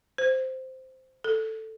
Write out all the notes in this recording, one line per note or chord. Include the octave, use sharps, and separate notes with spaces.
C5
A4